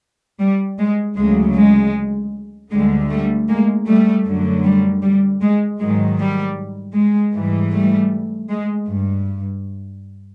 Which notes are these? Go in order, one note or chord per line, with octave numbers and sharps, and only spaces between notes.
G3
G#3
D2 C#3 F#3 G#3
G#3
D2 D3 G3 G#3
G3 A3
G#3 A#3
G3 A3
F#2 D3 F#3
G3
G3
G#3
G#2 D#3 F#3 G#3
G3
G#3
G#2 E3 G3
G3 A3
G#3
G2